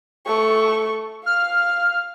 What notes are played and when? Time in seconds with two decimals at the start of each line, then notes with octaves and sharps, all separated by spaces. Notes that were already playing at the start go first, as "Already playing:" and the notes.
0.27 A3 C#6
1.26 F5 F6